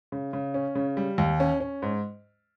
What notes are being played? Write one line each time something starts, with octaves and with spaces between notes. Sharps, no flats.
C#3
C#3
C#4
C#3
G3
D#2
C#4
C#4
G#2